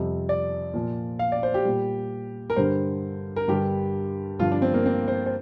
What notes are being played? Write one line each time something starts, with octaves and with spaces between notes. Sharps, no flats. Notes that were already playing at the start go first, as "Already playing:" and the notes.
Already playing: F2 C3 G3
D5
A#2 F3
F5
D5
C5
G4
A#2 G3
A#4
G2 D3 G3 C5
A#4
G2 D3 G3 G4
G2 D3 F3 F4
D4
C4
A#3
C4
C5
C5